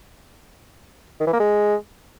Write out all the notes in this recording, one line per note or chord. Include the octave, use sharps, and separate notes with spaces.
D#3
E3
A#3
G#3